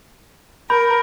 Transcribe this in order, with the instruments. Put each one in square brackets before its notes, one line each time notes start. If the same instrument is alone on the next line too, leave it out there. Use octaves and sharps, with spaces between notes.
[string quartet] A#4 [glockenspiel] B5 G6